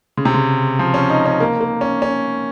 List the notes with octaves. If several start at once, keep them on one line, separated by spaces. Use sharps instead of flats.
C#3
C3
C#3
F3
C#4
D#4
C#4
A#3
A#3
C#4
C#4